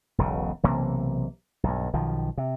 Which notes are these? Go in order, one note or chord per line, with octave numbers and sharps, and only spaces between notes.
E1 B1 C#3
B1 C3 E3 A#3
B1 G2
B1 D#3 F3
C3